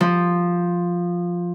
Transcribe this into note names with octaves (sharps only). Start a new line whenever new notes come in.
F3